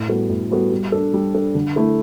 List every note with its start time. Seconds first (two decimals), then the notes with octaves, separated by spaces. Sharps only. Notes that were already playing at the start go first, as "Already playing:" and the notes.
Already playing: A2
0.08 G3 B3 F#4 A4
0.29 A2
0.51 G3 B3 F#4 A4
0.71 G3
0.92 D4 A4
1.14 G3
1.34 D4 A4
1.55 D3
1.76 A3 E4 A4